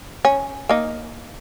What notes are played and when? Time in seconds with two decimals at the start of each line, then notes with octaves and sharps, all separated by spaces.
0.25 C#4
0.69 A#3 D#4